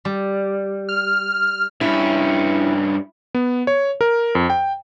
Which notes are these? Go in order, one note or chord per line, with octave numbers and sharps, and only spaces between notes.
G3
F6
G2 C#4 E4
B3
C#5
A#4
F2
G5